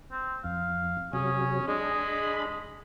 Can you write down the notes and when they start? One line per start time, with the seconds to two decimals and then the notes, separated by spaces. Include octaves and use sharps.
0.11 C4
0.44 F2 F5
1.13 C3 F#3 C#4 G#4
1.68 G#3 D4 G#4 D#5 B5